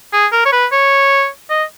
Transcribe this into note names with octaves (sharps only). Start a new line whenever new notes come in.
G#4
A#4
C#5
B4
C#5
D#5